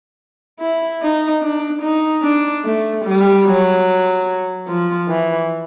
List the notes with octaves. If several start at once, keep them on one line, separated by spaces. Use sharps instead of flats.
E4
D#4
D4
D#4
D4
A3
G3
F#3
F3
E3